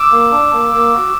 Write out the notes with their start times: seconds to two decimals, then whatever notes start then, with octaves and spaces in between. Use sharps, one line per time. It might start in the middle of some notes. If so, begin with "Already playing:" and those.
Already playing: D6 E6
0.11 A#3
0.31 D4
0.53 A#3
0.73 A#3
0.94 F#4